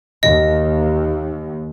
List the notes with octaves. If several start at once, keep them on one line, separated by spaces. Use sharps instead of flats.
D#2 D#5